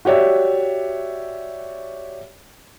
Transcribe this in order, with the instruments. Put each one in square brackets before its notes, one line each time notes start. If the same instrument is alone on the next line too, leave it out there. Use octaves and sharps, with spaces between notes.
[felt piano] F#4 G4 C#5 D5 E5